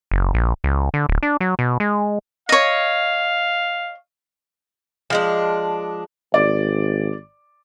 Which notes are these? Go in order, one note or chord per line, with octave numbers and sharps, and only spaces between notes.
F#1
A#1
C#2
D3
D1
D4
F#3
B2
G#3
C#5 D#5 F5
F3 G#3 D4
G#1 D5